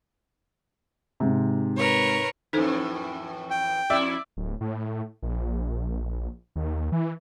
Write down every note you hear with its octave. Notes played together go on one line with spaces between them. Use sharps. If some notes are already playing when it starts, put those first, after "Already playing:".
G#2 C3
A#4 B4 C#5
F2 A2 E3 D#4 A4 C5
G5
F2 E4 D5 E5
D1
A2
A#1
D#2
E3